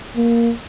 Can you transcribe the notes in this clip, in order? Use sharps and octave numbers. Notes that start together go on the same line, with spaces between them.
A#3